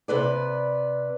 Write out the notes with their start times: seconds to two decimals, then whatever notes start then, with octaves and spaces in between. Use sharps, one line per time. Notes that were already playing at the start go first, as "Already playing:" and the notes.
0.08 C3 B4 D5